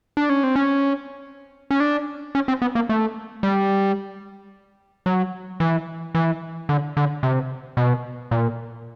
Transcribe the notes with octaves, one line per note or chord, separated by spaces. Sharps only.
D4
C#4
C4
C#4
C#4
D4
C#4
C4
B3
A#3
A3
G3
F#3
E3
E3
D3
D3
C3
B2
A#2